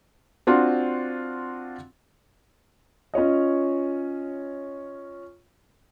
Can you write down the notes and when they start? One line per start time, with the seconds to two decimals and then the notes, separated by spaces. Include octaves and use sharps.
0.47 C4 D4 F4 F#4
3.14 C#4 F4 C#5 D#5